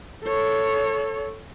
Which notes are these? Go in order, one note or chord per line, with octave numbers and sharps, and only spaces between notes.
A4 C#5